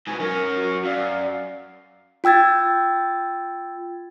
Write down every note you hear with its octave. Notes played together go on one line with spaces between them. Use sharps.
G#2 B2 G#5
F#2 C#4 A#4
F#4
F#2 D5 F5
F4 G5 E6 G#6 A6